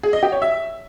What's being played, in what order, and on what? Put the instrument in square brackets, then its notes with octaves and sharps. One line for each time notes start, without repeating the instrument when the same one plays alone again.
[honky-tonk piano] G#4
D#5
G4
C#5
E5